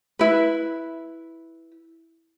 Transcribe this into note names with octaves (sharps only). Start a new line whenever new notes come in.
E4 B4